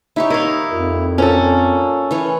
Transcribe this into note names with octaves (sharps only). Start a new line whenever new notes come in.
D#4 E4 G4 C#5
D#3 E4 D#5 F5
F2 A#2
A#2 C#4 A4
E3 C#5